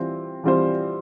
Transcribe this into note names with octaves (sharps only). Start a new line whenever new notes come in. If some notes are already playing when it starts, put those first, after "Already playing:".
Already playing: E3 G3 C4 F4 C5
E3 G3 C4 F4 C5